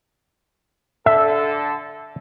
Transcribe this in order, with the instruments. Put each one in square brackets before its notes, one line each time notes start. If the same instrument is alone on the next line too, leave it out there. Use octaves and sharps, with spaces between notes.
[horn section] D3 A4 [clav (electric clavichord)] E5